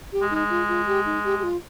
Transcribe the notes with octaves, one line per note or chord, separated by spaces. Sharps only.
G4
G#3
D#4
G#3
F4
F4
G4
D#4
G4
G4
F4